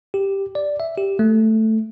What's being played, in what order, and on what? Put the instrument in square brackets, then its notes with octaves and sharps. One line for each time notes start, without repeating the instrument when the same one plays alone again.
[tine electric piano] G4
D5
E5
G4
A3